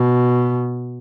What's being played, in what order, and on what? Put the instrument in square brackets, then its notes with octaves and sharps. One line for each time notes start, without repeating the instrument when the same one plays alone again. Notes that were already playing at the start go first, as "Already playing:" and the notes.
Already playing: [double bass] B2